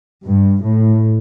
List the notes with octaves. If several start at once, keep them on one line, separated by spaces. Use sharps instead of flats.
G2
A2